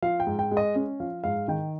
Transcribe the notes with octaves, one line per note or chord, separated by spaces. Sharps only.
F3 F5
G5
G#2
G5
G#3
D#5
C#4
F3 F5
G#2 F5
D#3 G5